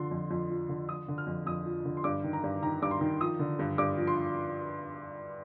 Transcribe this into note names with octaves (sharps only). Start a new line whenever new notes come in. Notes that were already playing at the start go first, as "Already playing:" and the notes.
Already playing: D3 F3 C6
F2
F2
F3
D3
F3 D#6
D3
F6
F2
F2 D#6
F3
D3
C6
G2 D6
D#3
A#5
G2
D#3 A#5
G2 D6
C6
D#3
F3 D#6
D3
G2
G2 D6
F3
C6